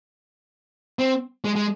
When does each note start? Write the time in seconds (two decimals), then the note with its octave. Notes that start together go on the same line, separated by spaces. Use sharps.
0.99 C4
1.45 G#3
1.56 G#3